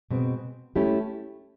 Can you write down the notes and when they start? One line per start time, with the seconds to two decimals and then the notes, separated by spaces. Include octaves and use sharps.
0.10 B2 G#3 C4
0.76 A3 C#4 E4 G4